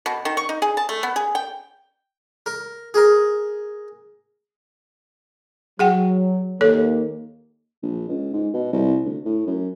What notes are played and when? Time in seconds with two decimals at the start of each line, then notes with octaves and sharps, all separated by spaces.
0.06 B2
0.25 D#3
0.37 C#6
0.49 D#4
0.62 G#4
0.77 A5
0.89 A3
1.03 B3
1.16 G#4
1.35 G5
2.46 A#4
2.94 G#4 A#4
5.79 F#3 G#4 F#5 G5
6.61 D#2 A#3 A4 C#5
7.83 A#1
8.09 C#2
8.33 G#2
8.54 B2
8.72 C2
9.05 D2
9.25 A2
9.47 F#2